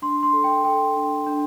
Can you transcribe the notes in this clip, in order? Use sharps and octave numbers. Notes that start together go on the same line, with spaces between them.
D4 C6
C6
A4
G5
A4 G5
D4
D4